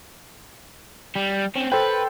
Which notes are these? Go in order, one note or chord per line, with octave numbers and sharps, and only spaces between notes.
G3
C4 C#4
A4 B4 C5 G5